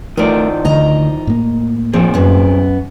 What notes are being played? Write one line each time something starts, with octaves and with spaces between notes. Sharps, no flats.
D#3 F3 A3 A#4 D5
D2 D3 D#5 A#5
A2 A#3
C2 F3 C4 G#4
F#2 B3